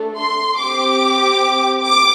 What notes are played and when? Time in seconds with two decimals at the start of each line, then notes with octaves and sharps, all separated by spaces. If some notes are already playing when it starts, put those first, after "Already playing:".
Already playing: A3 D4 A4
0.18 C6
0.59 C4 G4 D6
1.83 D6